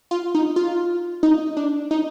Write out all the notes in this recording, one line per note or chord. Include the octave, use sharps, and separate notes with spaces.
F4
D#4
F4
D#4
D4
D#4